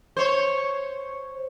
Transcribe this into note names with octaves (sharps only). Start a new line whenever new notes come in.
C5 C#5